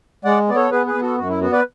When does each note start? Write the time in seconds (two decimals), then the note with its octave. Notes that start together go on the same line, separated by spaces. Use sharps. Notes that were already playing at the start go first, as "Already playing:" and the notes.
0.24 G#3 D5 F#5
0.48 B3 D5
0.56 A4 C#5
0.71 B3 G#4 B4
0.86 G#4 B4
0.94 B3
1.02 F#4 A4
1.18 F#2 F#4
1.29 E4
1.41 B3 F#4
1.53 B4 D5